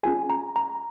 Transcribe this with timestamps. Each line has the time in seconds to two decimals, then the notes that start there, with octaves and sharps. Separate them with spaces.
0.03 C#4 F4 G#4 G#5
0.30 A#5
0.56 A#5